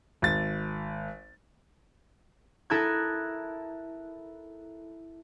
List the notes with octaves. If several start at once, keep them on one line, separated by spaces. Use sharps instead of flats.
G#1 A6
E4 A4 A#4 D#6 F#6 G#6